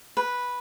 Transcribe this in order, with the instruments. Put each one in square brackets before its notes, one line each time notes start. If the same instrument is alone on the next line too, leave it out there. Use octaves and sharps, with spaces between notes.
[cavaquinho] B4